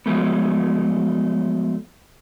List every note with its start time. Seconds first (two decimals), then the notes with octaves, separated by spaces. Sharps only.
0.06 F3 F#3 G#3 A3 B3